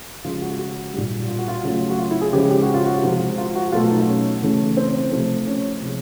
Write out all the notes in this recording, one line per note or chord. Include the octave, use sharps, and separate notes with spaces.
C#3 F3 G#3 F4
F#4
F#4
A#2 G3
F4
F#4
F4
C#3 F#3 A3
F#4
F4
E4
G#4
C#3 F3 G#3 G4
G4
F#4
F4
F#4
C3 F3 G#3
F4
F#4
B2 F#3 A3 F4
D#4
C#4
C#3 E3 A3
C4
C3 F3 A3
C#4
C3 F3 G#3